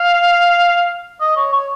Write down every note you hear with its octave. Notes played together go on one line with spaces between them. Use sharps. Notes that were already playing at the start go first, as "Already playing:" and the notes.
Already playing: F5
D#5
C#5
C#5